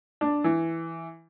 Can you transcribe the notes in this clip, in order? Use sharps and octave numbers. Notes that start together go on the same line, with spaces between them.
D4
E3